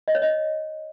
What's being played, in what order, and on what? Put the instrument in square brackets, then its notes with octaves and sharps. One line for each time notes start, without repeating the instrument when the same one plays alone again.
[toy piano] D#5
C#5
D#5